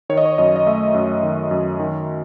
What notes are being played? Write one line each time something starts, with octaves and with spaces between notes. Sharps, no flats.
D#3 C#5
D#5
C#5
F#2 D#5
D#5
A3 E5
F#2
D#3
F#2
D#3